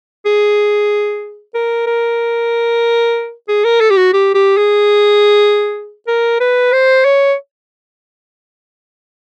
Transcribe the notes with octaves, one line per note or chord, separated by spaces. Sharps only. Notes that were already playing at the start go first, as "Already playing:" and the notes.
G#4
A#4
A#4
G#4
A#4
A4
G4
F#4
G4
G4
G#4
A#4
B4
C5
C#5